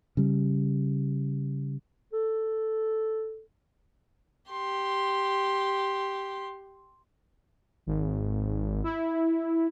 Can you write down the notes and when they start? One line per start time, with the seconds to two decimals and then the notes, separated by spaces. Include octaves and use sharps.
0.17 C#3 G3
2.13 A4
4.51 G4 C6
7.87 G#1
8.84 E4